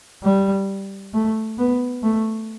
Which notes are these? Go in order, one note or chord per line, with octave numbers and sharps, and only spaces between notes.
G3
A3
B3
A3